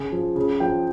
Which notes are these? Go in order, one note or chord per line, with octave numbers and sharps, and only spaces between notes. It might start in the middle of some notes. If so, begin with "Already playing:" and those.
Already playing: C#3 G#4
F3
C#3
F3 G5